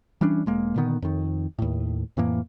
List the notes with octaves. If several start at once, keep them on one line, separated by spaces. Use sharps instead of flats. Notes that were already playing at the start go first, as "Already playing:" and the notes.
E3 G3 C#4 D4
E1 G#3 A#3
A#2 D3 D#3 B3
F2 D#3
D#2 A2
F2 A2 E3 A#3